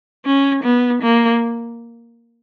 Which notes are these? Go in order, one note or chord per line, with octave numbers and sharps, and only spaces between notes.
C#4
B3
A#3